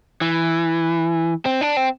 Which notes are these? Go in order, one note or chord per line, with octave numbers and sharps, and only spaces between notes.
E3
C4
D4
C4